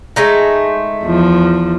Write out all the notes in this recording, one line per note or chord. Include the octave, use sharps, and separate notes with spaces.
G#3 A3 D#4
E2 F3